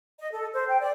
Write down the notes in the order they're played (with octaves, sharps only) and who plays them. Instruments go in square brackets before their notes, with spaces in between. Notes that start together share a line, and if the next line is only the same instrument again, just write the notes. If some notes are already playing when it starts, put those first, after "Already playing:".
[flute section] D#5
A4
C5
G5
D5